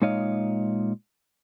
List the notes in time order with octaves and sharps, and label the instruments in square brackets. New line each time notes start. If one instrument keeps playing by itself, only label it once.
[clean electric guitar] A#2 G#3 D#4 C#5 D#5 F5